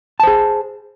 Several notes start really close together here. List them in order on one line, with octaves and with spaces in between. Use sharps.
A5 C5 G#4